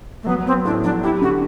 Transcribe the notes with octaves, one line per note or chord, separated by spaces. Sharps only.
A3
F#3 B3
B3 C4
A2 D4
F#3 D4
E4 G4
D3 F#4